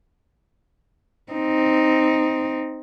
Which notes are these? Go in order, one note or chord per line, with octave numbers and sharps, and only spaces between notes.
C4 D#4